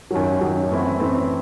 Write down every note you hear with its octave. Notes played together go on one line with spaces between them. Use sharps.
F#2 D#3 F#3
F#2 D#3 F#3
F#2 E3 A3 C4 E4
F#2 E3 A3 C4 E4